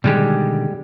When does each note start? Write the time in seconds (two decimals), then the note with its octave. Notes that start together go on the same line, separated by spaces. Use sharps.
0.04 B2 D3 D#3 G3 G#3 G4